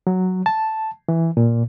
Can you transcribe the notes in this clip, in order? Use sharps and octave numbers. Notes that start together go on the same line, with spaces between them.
F#3
A5
E3
A#2